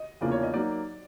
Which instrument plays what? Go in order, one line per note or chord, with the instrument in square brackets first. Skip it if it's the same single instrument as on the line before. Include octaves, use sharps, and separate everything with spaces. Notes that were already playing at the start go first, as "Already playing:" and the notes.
Already playing: [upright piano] D#5
[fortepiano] E2 C#3 F3 A#3 D4 [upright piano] D5
[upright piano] C#5
D#5
[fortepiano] F#3 A#3 D#4 [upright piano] D5